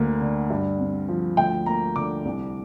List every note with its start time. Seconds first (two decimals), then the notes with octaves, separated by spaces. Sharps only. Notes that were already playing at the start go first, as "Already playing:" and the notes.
Already playing: D2 D3 A#3
0.21 D3
0.50 G2
0.80 C4
1.09 F3
1.37 D2 G5
1.66 A#3 A#5
1.96 D3 D6
2.25 C2